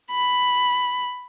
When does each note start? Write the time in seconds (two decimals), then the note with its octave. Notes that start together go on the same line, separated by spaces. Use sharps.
0.12 B5